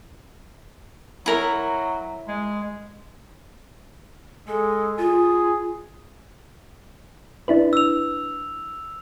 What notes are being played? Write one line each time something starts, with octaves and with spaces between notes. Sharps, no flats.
F#3 E4 A#4
G#3
G#3 A4
F4 G#4
D4 E4 B4
E6 F7